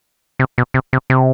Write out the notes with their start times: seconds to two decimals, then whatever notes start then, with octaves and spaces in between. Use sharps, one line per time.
0.39 C3
0.58 B2
0.74 C3
0.93 C3
1.10 C3